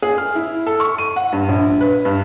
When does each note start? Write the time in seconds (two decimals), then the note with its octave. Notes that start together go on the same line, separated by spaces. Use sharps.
0.02 G#4
0.18 F6
0.35 E4
0.66 A4
0.80 C#6
0.98 D#7
1.16 F#5
1.32 G2
1.48 A#1
1.81 B4
2.05 G2